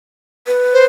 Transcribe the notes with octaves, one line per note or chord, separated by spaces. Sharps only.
B4
C5